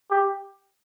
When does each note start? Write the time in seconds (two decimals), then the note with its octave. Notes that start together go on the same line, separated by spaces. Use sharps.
0.11 G4